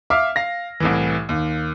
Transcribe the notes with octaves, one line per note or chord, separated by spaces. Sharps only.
E5 F5 D6 F6
F5 A#6
C2 A2 E3
D#2